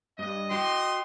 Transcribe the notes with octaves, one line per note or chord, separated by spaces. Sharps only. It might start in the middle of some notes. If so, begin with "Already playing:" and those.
G2 D#5
F#4 G5 C6